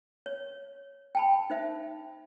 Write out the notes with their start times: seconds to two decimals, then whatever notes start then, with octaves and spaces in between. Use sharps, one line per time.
0.26 C#5
1.15 G5 A5 B5
1.50 D#4 C5 E5